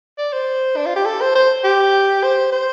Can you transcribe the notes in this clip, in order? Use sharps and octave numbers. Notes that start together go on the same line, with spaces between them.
D5
C5
D4
F4
G4
A4
C5
C5
G4
C5
C5